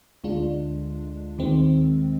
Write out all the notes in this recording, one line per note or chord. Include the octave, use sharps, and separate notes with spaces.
D2 D3 G#3 D4 F4
D#2 D#3 G#3 C4